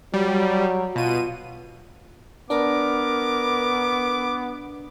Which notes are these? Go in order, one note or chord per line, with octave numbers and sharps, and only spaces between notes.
F#3 G3
B2 F4 D#7
B3 D4 A#4 D6